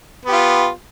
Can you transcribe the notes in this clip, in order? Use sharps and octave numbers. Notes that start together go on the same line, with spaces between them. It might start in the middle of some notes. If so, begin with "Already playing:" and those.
B3 F4 G4